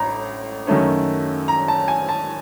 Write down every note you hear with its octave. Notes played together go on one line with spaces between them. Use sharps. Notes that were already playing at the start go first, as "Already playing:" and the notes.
Already playing: A1 A2 A#5
F#2 D#3 F#3 A3 C#4
A#5
A5
G#5
A5